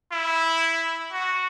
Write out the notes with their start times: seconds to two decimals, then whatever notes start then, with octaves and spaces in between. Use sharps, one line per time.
0.12 E4
1.13 F#4